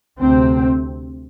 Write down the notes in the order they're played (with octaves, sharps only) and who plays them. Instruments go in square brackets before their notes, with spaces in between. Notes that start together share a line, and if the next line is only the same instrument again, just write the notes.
[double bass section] D2 C3 C4